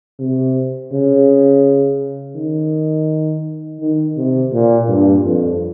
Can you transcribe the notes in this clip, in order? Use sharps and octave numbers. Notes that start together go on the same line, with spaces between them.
C3
C#3
D#3
D#3
C3
A#2
G2
F2